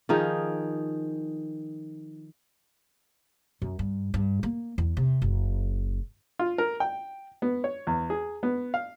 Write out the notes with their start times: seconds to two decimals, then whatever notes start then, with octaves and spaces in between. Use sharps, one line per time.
0.09 D#3 F3 D#4 G#4
3.62 F#2
3.79 G2
4.14 G2
4.43 A#3
4.78 E2
4.97 C3
5.22 F#1
6.39 F4
6.58 A#4
6.80 G5
7.42 B3
7.64 C#5
7.87 E2
8.10 G#4
8.43 B3
8.74 F5